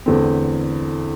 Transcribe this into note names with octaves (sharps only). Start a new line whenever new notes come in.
E2 D3 A3 C4